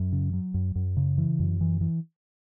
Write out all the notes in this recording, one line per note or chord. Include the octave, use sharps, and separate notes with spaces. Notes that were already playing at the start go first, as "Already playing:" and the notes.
Already playing: F#2
C#3
F#3
F#2
F#2
C#3
E3
F#2
E3
E3